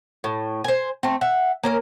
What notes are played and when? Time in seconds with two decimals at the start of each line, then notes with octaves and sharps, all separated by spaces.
0.24 A2
0.64 C5 G#5
1.03 A3 C4
1.21 E5 F#5
1.64 A#3 C#4 A#4